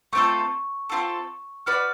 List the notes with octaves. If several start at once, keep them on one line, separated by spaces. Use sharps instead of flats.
A3 C4 F4 A4 C#6
A3 C4 F4 A4
F#4 B4 D5 F6